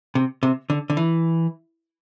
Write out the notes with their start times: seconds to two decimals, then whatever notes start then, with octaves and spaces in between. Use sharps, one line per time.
0.15 C3
0.43 C3
0.70 D3
0.90 D3
0.97 E3